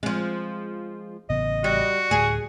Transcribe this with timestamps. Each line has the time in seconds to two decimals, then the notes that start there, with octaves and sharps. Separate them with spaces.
0.03 F3 G#3 C4
1.30 A1 C#3 B3 D#5
1.64 G3 F#4
2.11 D2 A2 G#4 G#5